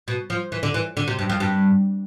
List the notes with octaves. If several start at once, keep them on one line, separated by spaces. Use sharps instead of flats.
B2
F3
E3
D3
E3
D3
C3
G2
F2
G2